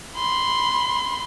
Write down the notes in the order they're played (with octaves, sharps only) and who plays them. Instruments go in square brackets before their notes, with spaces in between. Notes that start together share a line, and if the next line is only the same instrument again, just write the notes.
[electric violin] B5 C6